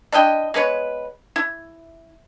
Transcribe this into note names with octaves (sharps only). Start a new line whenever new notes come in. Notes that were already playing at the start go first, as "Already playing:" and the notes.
D4 E4 D#5 G5
G#3 B3 B4 C#5
E4